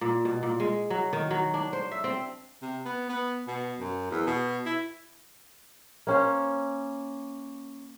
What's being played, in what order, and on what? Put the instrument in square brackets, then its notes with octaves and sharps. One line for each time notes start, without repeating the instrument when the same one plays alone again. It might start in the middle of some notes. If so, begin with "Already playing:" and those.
[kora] A#2
B2
A#2
G#3
F#3
D#3
F#3
D4
C5
E5
C4
[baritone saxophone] C3
B3
B3
B2
F#2
E2
B2
E4
[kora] A#3 C#4 C5